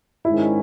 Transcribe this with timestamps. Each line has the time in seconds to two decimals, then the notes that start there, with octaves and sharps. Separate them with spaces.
0.25 G#2 D#3 G#3 C#4 E4